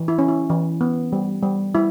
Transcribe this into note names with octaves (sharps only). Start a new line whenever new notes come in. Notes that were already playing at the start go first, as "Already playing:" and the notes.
Already playing: E3
E4
C#4
E4
E3
B3
G3
G3
G3 E4